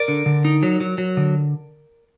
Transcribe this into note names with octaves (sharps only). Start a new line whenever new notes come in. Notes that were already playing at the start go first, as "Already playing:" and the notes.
Already playing: A#4 D5
D3
D3
D#4
F#3
F#3
F#3
D3